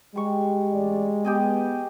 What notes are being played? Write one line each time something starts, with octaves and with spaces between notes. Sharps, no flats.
G3 G#3 C#6
A1 D5
B3 G4 G#4 D#5